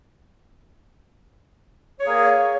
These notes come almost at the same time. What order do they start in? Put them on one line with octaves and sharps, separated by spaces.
C#5 G#4 A#3